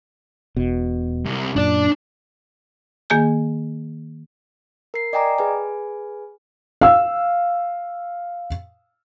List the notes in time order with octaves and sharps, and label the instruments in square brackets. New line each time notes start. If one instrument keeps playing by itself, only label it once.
[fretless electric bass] E1 B2
[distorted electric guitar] C2
[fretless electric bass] F#2 A#2 [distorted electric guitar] D4 D5
[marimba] D#3 A#3 G#4 G#5 G6
[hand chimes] A#4 C7
D5 D#5 G5 G#5 A#5 D6
G#4 B4 G#5
[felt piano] F5 E6